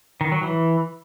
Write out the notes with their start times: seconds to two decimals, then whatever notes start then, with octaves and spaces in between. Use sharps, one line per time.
0.21 D#3
0.32 F#3
0.43 E3